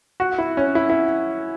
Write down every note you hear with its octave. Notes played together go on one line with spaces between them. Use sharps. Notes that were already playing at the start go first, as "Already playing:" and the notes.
F#4
E4
C#4
E4
E4